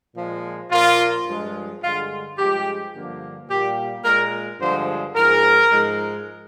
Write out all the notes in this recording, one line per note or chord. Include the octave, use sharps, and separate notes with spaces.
A#2 F3 G#3
A#2 F3 A#3 F4
G2 F3 G#3
G2 D3 G#3 F4
G2 F3 G#3 G4
G2 D3 F3 A#3
A#2 G3 A#3 G4
A#2 G#3 A#4
G2 D3 F3 G#3 C5
G#2 F3 G#3 A#4
G#2 F3 G#3